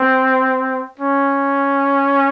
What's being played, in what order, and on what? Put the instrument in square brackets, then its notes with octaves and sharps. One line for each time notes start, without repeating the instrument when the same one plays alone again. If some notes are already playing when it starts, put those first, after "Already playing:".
Already playing: [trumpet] C4
C#4